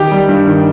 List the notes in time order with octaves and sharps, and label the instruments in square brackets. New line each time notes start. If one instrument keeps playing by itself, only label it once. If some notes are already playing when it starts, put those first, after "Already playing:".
Already playing: [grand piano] D#3 G4 G5
G3
G2
D#3